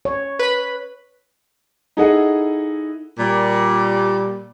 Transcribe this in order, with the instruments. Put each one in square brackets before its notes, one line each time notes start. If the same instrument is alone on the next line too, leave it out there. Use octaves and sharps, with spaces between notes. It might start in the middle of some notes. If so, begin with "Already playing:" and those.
[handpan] C#5
[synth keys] B4 B5
[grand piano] D#4 E4 G#4 A4 D#5 F#5
[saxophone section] A#2 G3